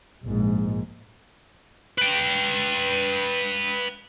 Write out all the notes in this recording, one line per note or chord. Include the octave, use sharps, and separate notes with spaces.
A#1 G#2
B4 G5